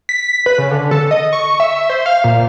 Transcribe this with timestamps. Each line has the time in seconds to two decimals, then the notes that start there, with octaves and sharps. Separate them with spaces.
0.09 B6
0.46 B4
0.58 C#3
0.71 D3
0.91 A4
1.11 D#5
1.33 C#6
1.60 E5
1.90 C5
2.06 F5
2.24 A#2